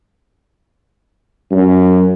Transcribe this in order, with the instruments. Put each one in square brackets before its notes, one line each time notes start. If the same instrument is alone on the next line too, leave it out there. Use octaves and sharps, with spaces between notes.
[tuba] F#2